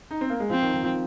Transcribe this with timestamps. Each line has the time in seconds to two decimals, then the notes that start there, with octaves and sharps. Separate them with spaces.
0.11 D#4
0.21 C4
0.30 A#3
0.40 G#3
0.50 F3 C4
0.62 D#3
0.74 D#3
0.83 F3